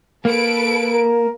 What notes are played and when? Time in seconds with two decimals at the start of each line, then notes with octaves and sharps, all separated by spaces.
0.25 A#3 A4 B4 D7
0.92 A#4